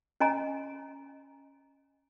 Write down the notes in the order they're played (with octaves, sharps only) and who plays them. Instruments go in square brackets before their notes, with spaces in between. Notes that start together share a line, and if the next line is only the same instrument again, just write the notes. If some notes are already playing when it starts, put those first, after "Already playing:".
[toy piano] C#4 D#5 G#5 A#5